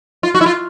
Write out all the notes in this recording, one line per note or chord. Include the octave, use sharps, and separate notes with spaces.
F4
F#4
E4
F4